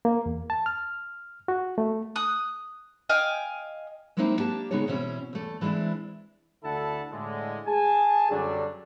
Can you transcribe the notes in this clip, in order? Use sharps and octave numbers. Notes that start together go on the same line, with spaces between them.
A#3
E2
A5
F6
F#4
A3
D#6 F#6
D#5 F5 G5 G#5
F#3 G#3 A#3 C4 D#4 E4
A#3 D4 G4 A5
C#3 G#3 B3 D#4 G#4 C#5
E2 B2 C4 C#4 E4
E2 A3
E3 G#3 C4 D4 E4
D2 D3 E4 A4 F#5 A5
A2 D3 G#3
G#4 G#5 A5
F#2 D3 F#3 G3 D4